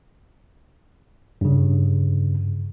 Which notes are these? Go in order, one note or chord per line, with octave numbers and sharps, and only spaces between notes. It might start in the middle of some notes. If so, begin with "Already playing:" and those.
G2 C#3